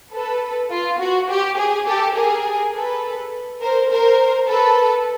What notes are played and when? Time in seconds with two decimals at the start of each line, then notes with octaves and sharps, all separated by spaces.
0.13 A4 B4
0.71 F4
0.99 F#4
1.30 G4
1.58 G#4
1.86 G4 A4
2.16 G#4 A#4
2.74 A4 B4
3.61 A#4 C5
3.90 A#4 C5
4.48 A4 B4